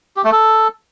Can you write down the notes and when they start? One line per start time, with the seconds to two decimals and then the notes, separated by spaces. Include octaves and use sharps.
0.17 G4
0.24 A3
0.32 A4